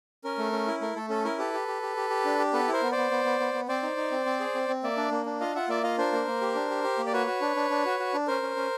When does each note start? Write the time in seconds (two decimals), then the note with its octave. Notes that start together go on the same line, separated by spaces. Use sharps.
0.24 C#4 A#4
0.38 A3
0.52 C#4
0.67 E4
0.81 A3 A#4
0.96 A3 A4
1.09 C#4 A4
1.25 E4 A#4
1.38 G4 A4 B4
1.54 G4
1.68 G4
1.82 G4
1.97 G4
2.10 G4
2.25 D4
2.39 G4
2.53 B3 A4 B4
2.68 E4
2.73 A#4 C5
2.82 B3
2.92 C5 D5
2.97 B3
3.11 B3
3.25 B3
3.40 B3
3.54 B3
3.68 C4 C5 D5
3.83 D#4
3.97 D#4
4.12 C4
4.26 C4
4.40 G#4
4.55 C4
4.68 C4
4.83 A#3 D5 E5
4.97 D4
5.11 A#3
5.26 D4
5.40 F4 D#5 F5
5.55 F4 E5 F#5
5.69 A#3 D5 E5
5.83 F4 D#5 F5
5.98 D4 A#4 C5
6.13 A#3
6.27 A#3
6.41 G4
6.55 D4
6.70 G4
6.84 G4
6.98 A#3
7.07 D5
7.13 F#4 B4 C#5
7.27 F#4
7.41 D4
7.56 D4
7.70 D4
7.85 F#4
8.00 F#4
8.14 D4
8.27 C#4 A#4 C5
8.42 C#4
8.56 C#4